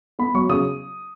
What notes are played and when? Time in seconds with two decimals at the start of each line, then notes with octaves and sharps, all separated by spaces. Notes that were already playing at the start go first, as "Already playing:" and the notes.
0.19 B3 B5
0.35 F#3 C#6
0.49 C#3 D#6